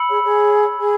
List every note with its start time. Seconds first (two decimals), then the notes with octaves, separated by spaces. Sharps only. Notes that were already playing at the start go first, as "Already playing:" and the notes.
Already playing: B5 E6 C#7 F#7
0.08 G#4 C#5
0.23 G#4 C#5
0.80 G#4